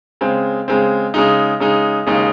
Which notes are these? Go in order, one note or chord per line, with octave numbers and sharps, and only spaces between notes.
C#3 G#3 C4
C#3 G#3 C4
C#3 G#3 D#4
C#3 G#3 D#4
D#2 C#3 G#3 D#4